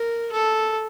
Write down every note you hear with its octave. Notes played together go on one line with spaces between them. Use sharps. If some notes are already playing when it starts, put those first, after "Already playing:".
Already playing: A#4
A4